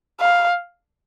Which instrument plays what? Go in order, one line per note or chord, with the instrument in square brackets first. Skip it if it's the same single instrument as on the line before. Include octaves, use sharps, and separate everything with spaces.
[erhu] F5